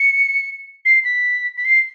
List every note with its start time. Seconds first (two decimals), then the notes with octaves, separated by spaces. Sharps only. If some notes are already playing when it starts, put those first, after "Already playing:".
Already playing: C#7
0.85 C7
1.05 B6
1.57 B6
1.65 C7